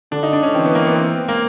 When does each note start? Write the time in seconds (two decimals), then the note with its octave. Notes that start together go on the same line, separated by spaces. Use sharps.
0.12 D3 D4
0.23 D#4
0.33 D4
0.43 C#4
0.54 E3 C4
0.65 B3
0.75 A#3
0.85 B3
0.95 C4
1.28 A#3